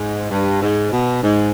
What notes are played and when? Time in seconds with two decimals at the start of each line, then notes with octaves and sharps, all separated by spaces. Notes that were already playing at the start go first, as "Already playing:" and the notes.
Already playing: G#2
0.31 G2
0.61 G#2
0.92 B2
1.22 G#2